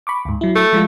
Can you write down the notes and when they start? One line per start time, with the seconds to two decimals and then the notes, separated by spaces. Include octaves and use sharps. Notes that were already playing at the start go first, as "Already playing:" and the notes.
0.07 B5 C#6 D6
0.25 D2 G#2
0.41 F#3 E4
0.55 A3
0.73 F3 G#3 F4